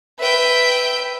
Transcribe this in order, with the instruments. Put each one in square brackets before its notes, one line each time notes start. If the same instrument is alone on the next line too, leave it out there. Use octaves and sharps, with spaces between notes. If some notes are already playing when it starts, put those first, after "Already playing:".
[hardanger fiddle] B4 [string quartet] E5 G5